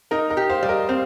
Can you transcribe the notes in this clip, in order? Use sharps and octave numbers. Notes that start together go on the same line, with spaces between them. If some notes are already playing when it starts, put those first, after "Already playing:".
D#4 A#4 D#5
A#4 D#5
G4
C5 F5
G3
A#4 D#5
C4 C5 F5